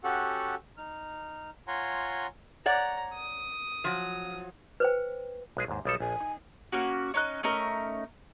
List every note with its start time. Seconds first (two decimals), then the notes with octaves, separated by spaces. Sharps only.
0.04 C#4 F#4 G4 A4 F#5
0.78 D#4 F6
1.68 F4 C#5 F#5 G#5 A#5 C6
2.66 C#5 D5 F#5 A#5
3.14 D#6
3.84 F3 F#3
4.80 B4 C5 G5
5.57 B1 G#3 G#4
5.68 D#2 G#2
5.85 B1 G3 A4 D#6
6.00 A#1 G#5
6.20 D#4
6.72 A#3 C#4 F#4
7.14 C#4 D#4 F#6
7.43 A3 C#4 D#4 A#4